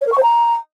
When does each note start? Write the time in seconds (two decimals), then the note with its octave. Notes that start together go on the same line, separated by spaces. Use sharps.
0.01 C#5
0.06 A#4
0.12 C#6
0.17 C5
0.23 A#5